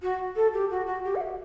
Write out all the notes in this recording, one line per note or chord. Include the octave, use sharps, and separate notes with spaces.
F#4
A4
G4
F#4
F#4
G4
F#5
E5